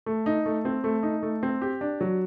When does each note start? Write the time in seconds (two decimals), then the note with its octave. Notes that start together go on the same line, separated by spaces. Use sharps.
0.06 A3
0.26 D#4
0.46 A3
0.65 C4
0.84 A3
1.03 D#4
1.23 A3
1.43 C4
1.62 G4
1.81 D4
2.01 F#3